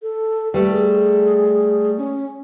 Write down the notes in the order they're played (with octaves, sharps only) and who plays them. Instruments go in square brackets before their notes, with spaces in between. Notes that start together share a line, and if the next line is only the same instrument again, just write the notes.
[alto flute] A4
[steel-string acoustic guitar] G3 A3 [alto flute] B4
[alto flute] G#4
C#4